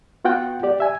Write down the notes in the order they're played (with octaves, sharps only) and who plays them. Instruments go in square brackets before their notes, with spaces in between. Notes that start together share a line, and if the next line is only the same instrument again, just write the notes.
[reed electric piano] B3 F4 F#4 F#5 G5
G4 D5
E5 G#5